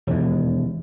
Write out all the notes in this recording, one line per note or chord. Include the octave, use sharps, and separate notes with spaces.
E1 D#2